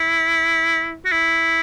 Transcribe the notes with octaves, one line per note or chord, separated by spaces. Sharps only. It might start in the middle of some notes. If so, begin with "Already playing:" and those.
Already playing: E4
F#4
E4